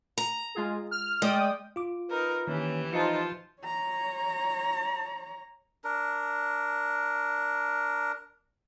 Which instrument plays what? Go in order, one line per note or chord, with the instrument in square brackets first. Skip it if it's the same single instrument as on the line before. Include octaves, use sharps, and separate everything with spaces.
[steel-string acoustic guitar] A#5
[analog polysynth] G#3 F4 G#4
F6
[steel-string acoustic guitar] G#3 [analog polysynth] D5 G5 D#6
[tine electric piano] F4 D6
[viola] D#4 A#4 [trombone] B4
[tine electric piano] D#3 A#3 [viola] E3 G4 [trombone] C#4
[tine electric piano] F3 C#7 [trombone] D#4 [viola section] F4 C5 A5
[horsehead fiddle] C#5 A#5
[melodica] D4 A#4